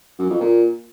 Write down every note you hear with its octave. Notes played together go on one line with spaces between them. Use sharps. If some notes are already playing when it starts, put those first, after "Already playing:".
F#2
F2
A#2